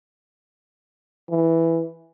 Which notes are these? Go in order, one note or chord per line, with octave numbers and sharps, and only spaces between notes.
E3